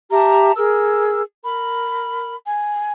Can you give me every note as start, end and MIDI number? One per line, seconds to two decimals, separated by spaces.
0.11 0.51 67
0.11 0.51 76
0.11 0.51 81
0.11 0.51 82
0.56 1.21 68
0.56 1.21 70
0.56 1.21 88
1.44 2.35 70
1.44 2.35 83
2.46 2.91 80